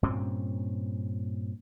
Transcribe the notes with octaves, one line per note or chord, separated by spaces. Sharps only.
G2 A#2 C4 C#4